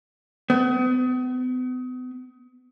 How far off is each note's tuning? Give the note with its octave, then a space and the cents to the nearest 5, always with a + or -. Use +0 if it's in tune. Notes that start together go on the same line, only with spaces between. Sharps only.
B3 +40